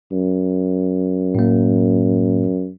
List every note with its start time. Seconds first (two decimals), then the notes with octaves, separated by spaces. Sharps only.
0.12 F#2
1.35 A2 A#3